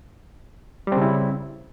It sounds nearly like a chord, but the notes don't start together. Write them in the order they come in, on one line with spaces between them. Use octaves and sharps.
G3 C4 C#3 E4